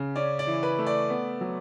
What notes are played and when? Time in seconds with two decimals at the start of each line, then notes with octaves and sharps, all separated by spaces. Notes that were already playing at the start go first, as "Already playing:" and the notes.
Already playing: C#3
0.16 C#4 D5
0.39 D5
0.47 E3
0.63 B4
0.79 A3
0.86 D5
1.10 B3
1.41 F#3